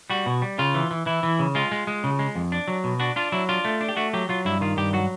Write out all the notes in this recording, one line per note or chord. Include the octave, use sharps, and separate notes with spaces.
G3 F#4
B2
G3
C#3 F4
E3
E3
E3 E4
E3
C#3
G#3 F4
G#3
G#3
C#3
G#3
F2
D4
F#3
B2
D4 F#4
D4 F4
F#3 E4
D4 F4
A3
D4
G4
A3 F#4
F#3 G4
F#3 F4
G2 E4
D#3 F4
G2 G4
F#3 F#4